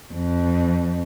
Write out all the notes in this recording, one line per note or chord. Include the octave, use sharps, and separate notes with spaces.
F2